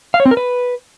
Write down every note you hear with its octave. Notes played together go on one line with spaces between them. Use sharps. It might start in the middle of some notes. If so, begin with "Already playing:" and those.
F5
C#5
C4
A#4
B4